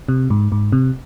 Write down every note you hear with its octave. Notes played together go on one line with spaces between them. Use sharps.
C3
G#2
G#2
C3